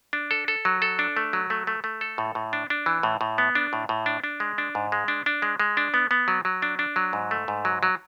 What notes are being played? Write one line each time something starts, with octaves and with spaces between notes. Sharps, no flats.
D4
A4
A4
F#3
A4
D4
A3
F#3
A3
A3
A3
A4
A2
A2
D4
D4
E3
A2
A2
B3
D4
A2
A2
D4
D4
G#3
D4
G#2
G#3
D4
D4
G#3
G#3
D4
B3
B3
F#3
F#3
D4
D4
F#3
G#2
A3
G#2
F#3
F#3